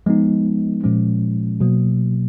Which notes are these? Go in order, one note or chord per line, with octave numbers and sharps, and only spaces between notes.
F3 G#3 B3 D#4
A#2 F3 G#3 C#4
B2 F#3 A#3